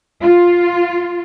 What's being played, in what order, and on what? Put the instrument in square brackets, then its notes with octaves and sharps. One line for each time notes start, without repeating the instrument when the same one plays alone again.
[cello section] F4